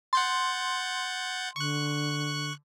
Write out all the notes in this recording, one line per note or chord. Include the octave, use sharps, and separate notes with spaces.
F#5 C6 G6 A6
D3 C#6 F#6